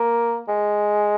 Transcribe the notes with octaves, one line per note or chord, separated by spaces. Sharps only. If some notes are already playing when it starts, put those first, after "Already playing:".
Already playing: A#3
G#3